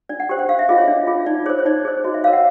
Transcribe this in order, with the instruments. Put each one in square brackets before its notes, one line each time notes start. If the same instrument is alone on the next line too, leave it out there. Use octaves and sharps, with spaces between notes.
[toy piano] D4 D5
F#5
G4 C5 G5
F#5
D4 F5
E5
F4 G#4 D#5
C#5
D4
F4 G#4
D#4 D5
G#4 C5 C#5
C#5
D#4 D5
G#4 C5
F#4 D#5
E5
C#5 F5
A#4
F#5